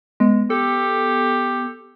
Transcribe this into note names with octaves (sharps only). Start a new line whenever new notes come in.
G#3 B3
G4 A4